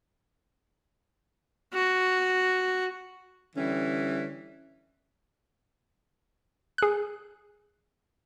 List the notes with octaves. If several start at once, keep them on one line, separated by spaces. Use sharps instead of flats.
F#4
D3 E3 G3 C#4
G#4 F#6